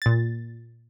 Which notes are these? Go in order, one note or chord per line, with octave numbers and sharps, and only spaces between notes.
A#2 A6